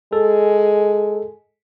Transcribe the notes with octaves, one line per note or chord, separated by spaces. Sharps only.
G#3 A4